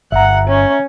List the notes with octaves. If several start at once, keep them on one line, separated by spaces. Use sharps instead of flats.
G1 E5 F#5 A#5
C#4